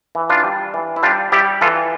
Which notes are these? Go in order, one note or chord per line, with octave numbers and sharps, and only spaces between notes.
E3
D4 F4
G3
E3
E4
G3 D4 F4
G3 E4 G4
E3 F4 A4